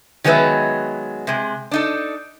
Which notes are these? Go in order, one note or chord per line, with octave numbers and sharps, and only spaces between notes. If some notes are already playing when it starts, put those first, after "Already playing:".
D#3 F#3 G#3 B3 B4 E5
C3 G#3
D4 D#4 A4